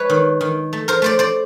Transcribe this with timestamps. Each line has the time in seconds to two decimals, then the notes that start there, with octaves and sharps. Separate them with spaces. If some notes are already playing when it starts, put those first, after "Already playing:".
Already playing: G#3 B4 C#5
0.10 D#3
0.41 D#3
0.73 A3
0.88 A#4 C5
1.02 A3 C5 D5
1.19 C5 D5